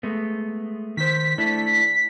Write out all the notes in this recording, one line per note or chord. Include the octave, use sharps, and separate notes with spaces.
G#3 A3 B3
D#3 C5 B6
A3 D4 E4